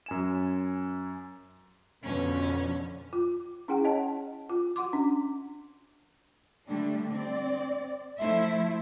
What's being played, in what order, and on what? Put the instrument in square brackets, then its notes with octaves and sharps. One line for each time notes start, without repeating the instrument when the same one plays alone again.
[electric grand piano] F#2 G#5 E7
[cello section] F2 B2 D3 [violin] C#4
[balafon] F4
C#4 E4 G#4 F#5 G5
C#5 D#5 F#5 A5
F4
F#4 F#5 C6 D6
C#4 D4
[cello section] D3 G3 A3 D4
C4 D5
F3 A3 E4 C5 E5